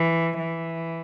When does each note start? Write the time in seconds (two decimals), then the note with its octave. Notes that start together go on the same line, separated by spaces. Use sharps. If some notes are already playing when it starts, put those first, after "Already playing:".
Already playing: E3
0.39 E3